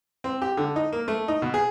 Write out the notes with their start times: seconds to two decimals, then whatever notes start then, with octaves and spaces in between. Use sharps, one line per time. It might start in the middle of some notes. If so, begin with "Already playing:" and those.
0.24 C4
0.42 G4
0.57 D3
0.76 D#4
0.93 A#3
1.08 A3
1.28 D#4
1.42 B2
1.54 G#4